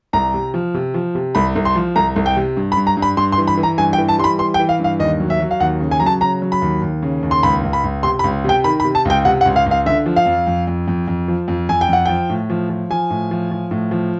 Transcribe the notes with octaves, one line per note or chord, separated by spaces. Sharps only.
C2 A#5
C3
F3
C3
F3
C3
C2 B5
C2
C6
F3
C2 A#5
C2
G5
C3
G2
B5
G2
A#5
G2
B5
G2 C6
C6
E3
B5
E3
A#5
G2 G#5
G5
E3
A5
G3 C6
B5
E3 C6
G5
E3
F5
G2
F5
D#2 D#5
F#3
E5
F#3
F5
D#2 F#5
C#3
G#5
F#3 A#5
A5
C#3 A#5
F#3
B5
D#2
D#2
C#3
D#2
C6
C#2 B5
C#2
B5
C#2
C3 C6
B5
C#2
C3 G5
D#3 B5
B5
C3
A5
C#2 G5
C3 F#5
F#5
C#2
F5
C#2
F5
D3 E5
F3
F5
F2
F2
F2
F2
F2
F3
F2
F2 G#5
G5
F2 F#5
F3 G5
A2
F3
F3
F3 G#5
A2
F3
F3
A2
F3